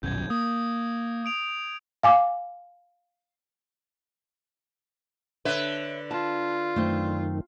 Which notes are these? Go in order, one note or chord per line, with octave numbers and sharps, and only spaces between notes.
D#1 B1 F#2 G6 G#6
A#3 D#6
D#6 D7 F7
F5 G#5 D6
D3 B4 C#5 E5
F4 A5
F#2 D#3 A3 C4